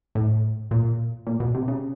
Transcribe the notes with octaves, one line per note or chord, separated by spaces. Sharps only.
A2
A#2
A#2
B2
C3
C#3